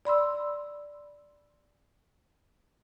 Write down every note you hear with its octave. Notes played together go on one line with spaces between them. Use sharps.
D5 B5 C6 E6